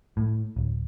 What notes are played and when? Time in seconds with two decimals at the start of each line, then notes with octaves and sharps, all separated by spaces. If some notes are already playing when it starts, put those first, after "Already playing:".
0.17 A2
0.56 D1